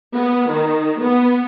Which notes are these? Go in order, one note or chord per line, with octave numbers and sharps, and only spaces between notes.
B3
D#3
B3